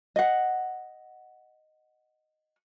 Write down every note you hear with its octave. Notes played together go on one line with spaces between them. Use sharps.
D#5 F#5